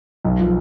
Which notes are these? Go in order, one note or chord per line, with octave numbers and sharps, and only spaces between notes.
B1
F3